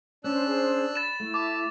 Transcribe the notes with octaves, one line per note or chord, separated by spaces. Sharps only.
C#4 D4 C5 E6 F#6
G#4 C5
B5 A6 E7
A3 E4
A5 D6